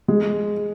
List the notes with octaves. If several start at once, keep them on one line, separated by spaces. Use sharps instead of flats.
G#3